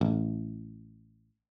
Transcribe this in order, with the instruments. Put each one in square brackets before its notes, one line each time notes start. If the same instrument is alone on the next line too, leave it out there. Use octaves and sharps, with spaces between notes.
[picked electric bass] A1